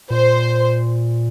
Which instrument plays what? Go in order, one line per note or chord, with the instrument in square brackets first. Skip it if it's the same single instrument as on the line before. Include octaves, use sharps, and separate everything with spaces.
[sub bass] A#2 [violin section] C5